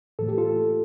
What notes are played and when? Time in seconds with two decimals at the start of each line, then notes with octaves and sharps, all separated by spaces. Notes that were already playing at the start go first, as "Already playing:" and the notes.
0.19 A2 E3 A3 A4
0.29 G4
0.38 F4 A4